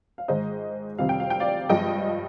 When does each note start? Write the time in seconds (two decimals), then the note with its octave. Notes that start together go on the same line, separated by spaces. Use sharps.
0.18 F5
0.28 G#2 D#3 G#3 C5 D#5
0.98 F2 C3 D#3 G3 F5
1.09 G5
1.20 F5
1.30 G5
1.40 D5 F5
1.69 G2 F3 G#3 D#5 G5